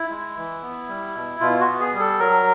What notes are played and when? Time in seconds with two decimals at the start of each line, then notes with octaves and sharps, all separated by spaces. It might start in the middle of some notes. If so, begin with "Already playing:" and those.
Already playing: E4
0.10 G#3
0.37 E3
0.62 B3
0.89 G3
1.15 B2
1.40 B2 F4
1.60 F#4
1.67 B3
1.80 G#4
1.93 G3
2.00 A4
2.19 F#3 A#4